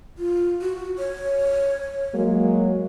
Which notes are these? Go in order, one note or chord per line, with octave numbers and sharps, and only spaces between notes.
F4
F#4
C#5
F#3 G#3 A#3